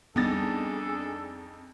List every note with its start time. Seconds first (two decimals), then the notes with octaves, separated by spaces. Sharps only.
0.16 F2 G3 B3 D4 D#4 G#4 A4 A6